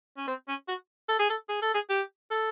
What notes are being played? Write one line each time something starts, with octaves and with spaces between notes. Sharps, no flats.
C#4
C4
C#4
F#4
A4
G#4
A4
G#4
A4
G#4
G4
A4